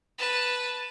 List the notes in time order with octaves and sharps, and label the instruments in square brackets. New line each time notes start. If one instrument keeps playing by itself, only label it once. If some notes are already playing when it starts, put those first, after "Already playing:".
[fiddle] B4 A5